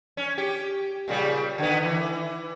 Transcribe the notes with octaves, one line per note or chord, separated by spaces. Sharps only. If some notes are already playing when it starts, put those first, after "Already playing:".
C#4
G4
A#2 C#3 G3
D3 D#3 B3
E3